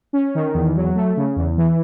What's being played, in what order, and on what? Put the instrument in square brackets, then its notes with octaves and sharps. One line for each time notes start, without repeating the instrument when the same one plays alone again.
[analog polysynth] C#4
D#3
E2
F#3
A3
C#3
E2
E3